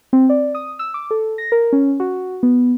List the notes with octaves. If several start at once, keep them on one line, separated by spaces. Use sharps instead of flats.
C4
D5
D#6
E6
D6
A4
A#6
A#4
C#4
F#4
B3